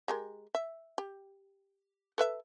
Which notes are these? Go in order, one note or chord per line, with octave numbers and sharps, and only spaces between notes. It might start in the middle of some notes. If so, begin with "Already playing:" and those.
G#3 G4 A#4
E5
G4
A4 B4 E5